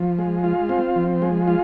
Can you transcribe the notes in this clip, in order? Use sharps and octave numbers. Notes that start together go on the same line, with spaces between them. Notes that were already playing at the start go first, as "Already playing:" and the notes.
Already playing: F3
G#3
F4
C4
F3
G#3
F4